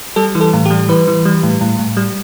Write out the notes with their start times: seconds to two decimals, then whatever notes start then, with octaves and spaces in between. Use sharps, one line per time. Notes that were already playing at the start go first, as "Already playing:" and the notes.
0.16 G3 A4
0.35 E3
0.41 A4
0.53 A2
0.66 G4
0.70 G3
0.89 E3 B4
1.07 E3
1.25 G3
1.43 A2
1.61 A2
1.79 A2
1.97 G3